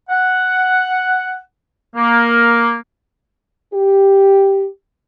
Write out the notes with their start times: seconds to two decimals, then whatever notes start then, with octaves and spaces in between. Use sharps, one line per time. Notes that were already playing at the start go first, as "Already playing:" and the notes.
0.10 F#5
1.96 A#3
3.73 G4